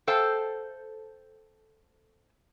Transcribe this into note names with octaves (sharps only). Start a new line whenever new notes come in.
A4 C5 F5 G5 A5